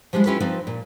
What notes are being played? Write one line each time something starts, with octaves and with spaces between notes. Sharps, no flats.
F3 G3 G#3 D4 E4
C#4 E4 F4 G4 A4 B4
F3 C4 D#4 B4 D5
A#2